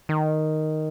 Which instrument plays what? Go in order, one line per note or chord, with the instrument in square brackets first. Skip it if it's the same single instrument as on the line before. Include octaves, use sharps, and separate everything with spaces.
[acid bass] D#3